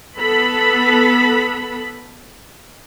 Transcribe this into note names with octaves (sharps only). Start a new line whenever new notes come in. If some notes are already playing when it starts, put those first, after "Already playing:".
B3 A4 B5